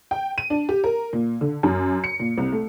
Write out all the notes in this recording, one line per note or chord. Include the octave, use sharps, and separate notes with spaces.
G5
D#7
D4
G4
A#4
A#2
D3
F#2
C#7
A#2
C2
A3